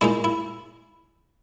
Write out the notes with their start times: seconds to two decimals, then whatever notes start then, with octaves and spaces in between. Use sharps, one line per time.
0.01 A#2 G#3 D#4 E4
0.24 E4